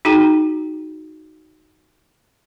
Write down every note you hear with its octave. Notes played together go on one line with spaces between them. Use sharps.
D#4 F#4 G#4 G5 A#5